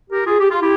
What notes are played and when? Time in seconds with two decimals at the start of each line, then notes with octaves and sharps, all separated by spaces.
0.10 G4 A#4
0.26 F4 G#4
0.39 G4
0.50 F4
0.61 E4 G4